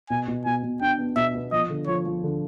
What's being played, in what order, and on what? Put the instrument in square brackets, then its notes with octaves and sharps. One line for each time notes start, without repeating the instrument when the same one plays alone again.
[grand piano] B2 [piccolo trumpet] G#5
[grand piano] B2
[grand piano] B2 [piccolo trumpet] G#5
[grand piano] B2
[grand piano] D4 [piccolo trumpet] G5
[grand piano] B3
[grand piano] B2 [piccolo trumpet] E5
[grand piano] B3
[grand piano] F3 [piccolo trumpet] D#5
[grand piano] D3
[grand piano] F3 [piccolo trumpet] C#5
[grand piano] F3
D3